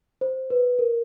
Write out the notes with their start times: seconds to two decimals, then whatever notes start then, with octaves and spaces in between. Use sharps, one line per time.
0.21 C5
0.50 B4
0.79 A#4